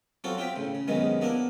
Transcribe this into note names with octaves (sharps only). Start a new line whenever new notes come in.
F#3 C4 F4 F#4 A4
C4 F4 G4 E5 G5
A2 C#3
C#3
F#2 C3 D#3 G#3 B3
A#3 B3 D4 E4 A#4